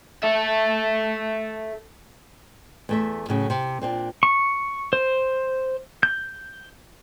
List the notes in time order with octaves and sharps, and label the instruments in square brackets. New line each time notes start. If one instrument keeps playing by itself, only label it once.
[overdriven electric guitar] A4 E5
[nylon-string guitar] E2 A3 E5
A2 C#3 F#3
C3
A#2 C4 D4
[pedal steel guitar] C#6
C5
G6